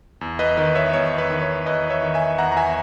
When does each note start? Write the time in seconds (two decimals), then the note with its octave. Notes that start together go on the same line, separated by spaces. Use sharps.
0.21 E2
0.39 B4 D#5
0.57 D#3 B4 D#5
0.75 C#5 E5
0.93 E2 C#5
1.18 B4
1.30 D#3
1.41 C#5
1.66 E2 B4 D#5
1.90 C#5 E5
2.03 D#3
2.14 E5 G#5
2.38 E2 F#5 A#5
2.52 A#5
2.57 E5 G#5